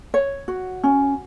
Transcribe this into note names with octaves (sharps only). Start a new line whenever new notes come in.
C#5
F#4
C#4